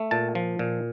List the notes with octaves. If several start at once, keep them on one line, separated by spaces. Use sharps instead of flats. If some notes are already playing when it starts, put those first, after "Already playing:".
Already playing: A3
A#2 A5
F3
A#2